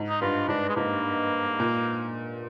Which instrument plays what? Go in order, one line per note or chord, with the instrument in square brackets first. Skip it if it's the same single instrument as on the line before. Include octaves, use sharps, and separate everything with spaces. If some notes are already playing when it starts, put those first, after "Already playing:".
Already playing: [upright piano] G#2
[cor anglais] D#4
[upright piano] G2 [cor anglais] F4
[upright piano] G#2 [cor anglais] D4
[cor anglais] G#3
[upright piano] G#2 [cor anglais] A#3
[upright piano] A#2